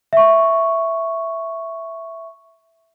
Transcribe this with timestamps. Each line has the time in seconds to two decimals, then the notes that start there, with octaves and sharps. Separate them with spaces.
0.13 E5 C#6